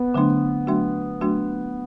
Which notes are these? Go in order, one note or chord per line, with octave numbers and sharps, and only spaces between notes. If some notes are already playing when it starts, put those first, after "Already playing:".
Already playing: B3
D3 F#3 A3 D4
F#3 A3 D4 F#4
F#3 A3 D4 F#4